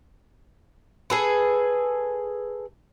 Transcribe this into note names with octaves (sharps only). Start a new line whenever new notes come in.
G#4 A4 B4